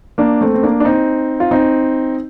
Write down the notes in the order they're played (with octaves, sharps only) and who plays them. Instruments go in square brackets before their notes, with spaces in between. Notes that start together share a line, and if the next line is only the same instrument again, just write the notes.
[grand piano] A#3 D4
A3 C4
C4
A#3 D4
D4
C4 D#4
F4
C4 D#4